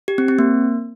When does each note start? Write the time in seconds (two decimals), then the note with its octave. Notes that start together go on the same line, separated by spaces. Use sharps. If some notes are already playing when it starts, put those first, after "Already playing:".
0.08 G4
0.18 C4
0.28 C4
0.39 A#3